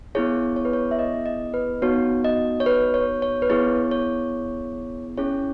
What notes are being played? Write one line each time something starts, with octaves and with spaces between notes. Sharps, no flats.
B3 E4 G#4 C#5
C#5
B4
C#5
E5
D#5
D#5
B4
B3 D#4 F#4 C#5
D#5
C#5
B4
C#5
C#5
B4
B3 E4 G#4 C#5
C#5
C#4 E4 G#4 C#5